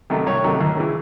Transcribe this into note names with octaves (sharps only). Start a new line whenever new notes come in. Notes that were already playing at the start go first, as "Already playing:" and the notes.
C3 D#3 F#3 A3
C2 C#5
C3 D#3 F#3 A3
D#2
C#3 E3